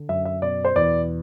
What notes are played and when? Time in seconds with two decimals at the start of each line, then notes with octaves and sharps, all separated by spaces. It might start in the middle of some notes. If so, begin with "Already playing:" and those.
Already playing: D3
0.09 F#2 E5
0.25 E5
0.42 B2 D5
0.65 C5
0.76 E2 D5